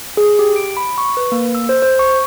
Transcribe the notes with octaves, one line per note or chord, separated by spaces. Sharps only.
G#4
G4
D7
B5
C#6
B4
A#3
E6
C5
C5
C#6